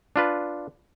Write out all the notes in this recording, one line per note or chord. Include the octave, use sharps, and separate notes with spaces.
D4 F4 B4